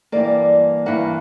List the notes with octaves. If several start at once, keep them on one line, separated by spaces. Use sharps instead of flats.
G2 E3 A#3 D5
G2 E3 A#3 F#5